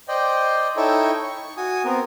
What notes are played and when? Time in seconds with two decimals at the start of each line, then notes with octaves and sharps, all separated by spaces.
0.08 C5 D5 D#5 G5
0.77 D#4 E4 A4 C#5 G5
1.23 C#6
1.57 F#4 G#5 D#6
1.85 B3 C4 A#4